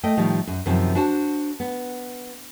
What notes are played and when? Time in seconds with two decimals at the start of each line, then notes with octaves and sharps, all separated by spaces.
0.03 A3 D#5 G5
0.17 A2 D#3 F3 G3
0.47 F#2
0.66 F#2 C3 D#3 F3 C4
0.95 D4 F#4 C5 A5
1.60 B3